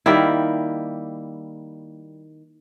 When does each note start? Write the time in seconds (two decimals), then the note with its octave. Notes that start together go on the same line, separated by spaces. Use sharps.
0.06 D#3 G3 A#3 E4